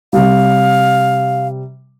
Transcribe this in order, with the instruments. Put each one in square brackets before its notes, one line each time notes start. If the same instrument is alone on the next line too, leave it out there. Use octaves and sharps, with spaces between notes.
[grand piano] C3 G3 [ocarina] F5